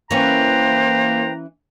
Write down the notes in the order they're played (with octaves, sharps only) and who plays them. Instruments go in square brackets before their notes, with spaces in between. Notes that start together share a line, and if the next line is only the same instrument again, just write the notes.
[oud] E3 C#4 [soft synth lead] A#3 [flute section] B4 C5 G5 [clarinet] A#5